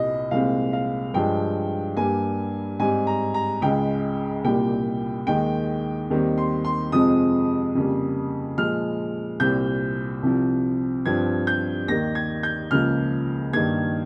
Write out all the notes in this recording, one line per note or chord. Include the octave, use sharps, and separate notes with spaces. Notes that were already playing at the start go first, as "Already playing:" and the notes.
Already playing: C2 A#2 G3 A#3 D#5
C2 A#2 G#3 C4 F5
F5
G2 F3 G#3 G5
G2 G3 A#3 G#5
G#2 G3 C4 G#5
A#5
A#5
C#2 C#3 G#3 G5
C2 A#2 G3 A#3 G5
D#2 D#3 G#3 G5
D#2 D#3 G3 C4
C6
C6
F2 C3 F3 G#3 C4 D#6
F2 C#3 G3 A#3
A#2 F3 G#3 F6
C2 A#2 G3 C4 G6
C2 C3 F3
G2 F3 C4 G#6
G6
D#2 D#3 A#3 A#6
G#6
G6
C#2 C#3 F3 A#3 F6
G2 D#3 A#3 G#6